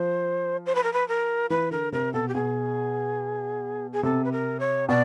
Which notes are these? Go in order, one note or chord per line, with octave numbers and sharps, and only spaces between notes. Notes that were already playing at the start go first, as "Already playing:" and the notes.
Already playing: F3 C5
C5
B4
A#4
B4
A#4
E3 B4
D3 A#4
C3 A#4
B2 A4
G4
B2 G#4
G#4
C3 A4
B4
A#4
C#5
B2 D5